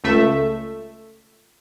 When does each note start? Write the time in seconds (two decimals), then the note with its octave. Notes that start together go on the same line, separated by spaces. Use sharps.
0.04 C#2 A3 E5